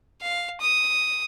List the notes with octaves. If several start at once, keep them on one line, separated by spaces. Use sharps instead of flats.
F5
D#6